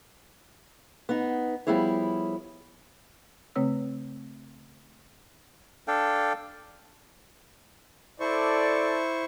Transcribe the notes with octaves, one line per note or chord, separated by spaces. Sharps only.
B3 D#4
F3 G3 B3 E4 G#4 C#5
C#3 A3 C4 C#5 E6
D4 A4 F5 G5
E4 A4 C5 D5 C#6